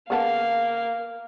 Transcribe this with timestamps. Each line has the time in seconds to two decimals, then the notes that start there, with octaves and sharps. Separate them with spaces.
0.10 C#3 A#3 B3 F5 A5